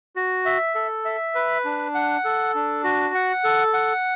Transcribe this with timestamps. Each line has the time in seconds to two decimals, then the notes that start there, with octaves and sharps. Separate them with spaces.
0.16 F#4
0.45 E5
0.75 A4
1.05 E5
1.35 B4
1.65 D4
1.95 F#5
2.25 A4
2.55 D4
2.84 F#4
3.15 F#5
3.44 A4
3.74 F#5